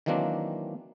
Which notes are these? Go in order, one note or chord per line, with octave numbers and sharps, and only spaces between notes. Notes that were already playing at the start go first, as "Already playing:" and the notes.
D#3 E3 F#3 A#3 C4 D4